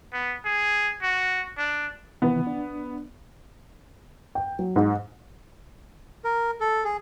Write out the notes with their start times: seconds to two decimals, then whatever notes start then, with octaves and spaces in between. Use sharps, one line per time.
0.13 B3
0.45 G#4
1.02 F#4
1.57 D4
2.22 C3 D#3 E3 B3
2.47 D4
4.35 G5
4.59 F#3
4.76 G#2
6.24 A#4
6.60 A4
6.84 G#4